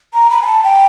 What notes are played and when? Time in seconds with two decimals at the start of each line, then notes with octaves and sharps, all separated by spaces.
0.14 A#5
0.30 B5
0.42 G#5
0.46 A5
0.63 G5